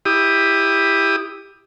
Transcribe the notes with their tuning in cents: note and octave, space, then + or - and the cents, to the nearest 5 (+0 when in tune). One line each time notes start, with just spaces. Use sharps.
E4 +0 G4 +15 D#6 +0